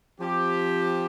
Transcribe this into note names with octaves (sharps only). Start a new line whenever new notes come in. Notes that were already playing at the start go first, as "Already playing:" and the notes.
F3 C4 G4